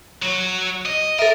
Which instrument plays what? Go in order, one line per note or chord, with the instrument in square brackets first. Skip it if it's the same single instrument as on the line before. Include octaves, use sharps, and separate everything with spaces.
[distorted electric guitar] F#3
D#5
[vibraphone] A4 E5 [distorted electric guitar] A#4